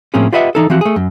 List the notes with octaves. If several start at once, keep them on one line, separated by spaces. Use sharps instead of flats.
A2 F3 A#3 C4 C#4 G#4
F4 G4 B4 D#5 E5 F#5
E3 D#4 A4
E3 F3 C4 F#4 G4
A3 G#4
F#2